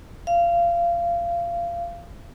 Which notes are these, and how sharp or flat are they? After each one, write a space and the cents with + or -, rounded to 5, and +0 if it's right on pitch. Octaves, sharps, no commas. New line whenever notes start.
F5 -25